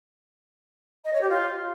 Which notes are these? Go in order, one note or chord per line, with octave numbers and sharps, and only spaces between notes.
D#5
C#5
G4
F4